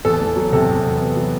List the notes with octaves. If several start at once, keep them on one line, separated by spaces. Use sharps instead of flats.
E2 A4
E2
F#3
C3 A4
E2
B3
B3
F#3